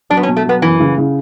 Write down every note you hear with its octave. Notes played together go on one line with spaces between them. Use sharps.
F#3 D4
B3
C#4
B2
A3
F#3 B3
F#2 E3
C#3
C#3